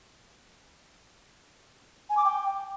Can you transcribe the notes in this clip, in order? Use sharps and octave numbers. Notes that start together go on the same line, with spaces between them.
G#5
D6
G5